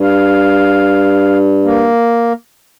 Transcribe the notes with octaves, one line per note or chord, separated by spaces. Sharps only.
G2 F5
A#3